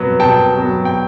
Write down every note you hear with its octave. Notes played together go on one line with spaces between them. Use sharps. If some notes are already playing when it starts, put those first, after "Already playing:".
Already playing: B2 F#3 B3
B2 G5 A5
F#3 B3
G5